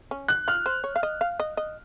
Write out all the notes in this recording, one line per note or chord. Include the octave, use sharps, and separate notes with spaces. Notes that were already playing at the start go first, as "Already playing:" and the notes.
C#4
F#6
F4 F6
C5
C#5
F5
D#5
F5
D#5
D#5